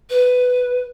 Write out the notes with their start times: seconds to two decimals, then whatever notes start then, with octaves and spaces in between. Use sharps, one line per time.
0.10 B4